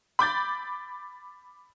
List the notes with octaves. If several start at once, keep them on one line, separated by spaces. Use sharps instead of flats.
B5 D6 G6 A6